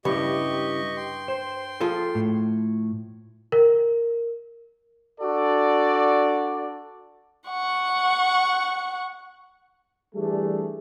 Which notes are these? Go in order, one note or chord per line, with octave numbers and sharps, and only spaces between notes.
G2 C#3 G3 E4 G4 D#5 C#6
G5 C6
C5
F3 F4 G#4 A4
A2
A#4
D4 F#4 A4 D5
F#5 C#6
E3 G3 A3 D4 G#4